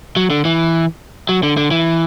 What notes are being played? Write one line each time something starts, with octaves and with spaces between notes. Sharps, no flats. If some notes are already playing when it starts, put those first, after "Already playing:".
F#3
D3
E3
F#3
D3
D3
E3